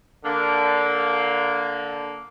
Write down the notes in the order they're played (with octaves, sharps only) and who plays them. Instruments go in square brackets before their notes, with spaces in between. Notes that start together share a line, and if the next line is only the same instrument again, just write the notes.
[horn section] D3 A#3